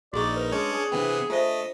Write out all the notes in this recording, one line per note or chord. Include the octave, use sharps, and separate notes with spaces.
A#1 D#4 F#4 G#4 D5 C#6
A#4 B4
G#3 C#4 D4 C#5
G#4
C3 E3 B3 D4 G5
A3 F4 C5 D#5 E5